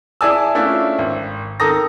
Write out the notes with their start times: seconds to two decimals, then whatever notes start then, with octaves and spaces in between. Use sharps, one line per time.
0.21 E4 G#4 D5 G#5 A5 E6
0.55 A3 C#4 D4 E4 F4
0.99 G#1
1.60 D#3 A4 A#5 D#6 A#6